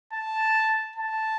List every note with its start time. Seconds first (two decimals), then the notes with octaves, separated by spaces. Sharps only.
0.13 A5
0.96 A5